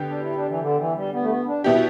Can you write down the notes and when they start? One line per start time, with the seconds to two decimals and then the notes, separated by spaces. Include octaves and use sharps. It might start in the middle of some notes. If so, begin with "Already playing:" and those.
Already playing: D3 B3 G4
0.09 D4
0.22 E4
0.35 D4
0.48 E3
0.61 D3
0.78 E3
0.95 G3
1.12 B3
1.22 A3
1.30 B3
1.47 D4
1.64 B2 G3 B3 E4 G4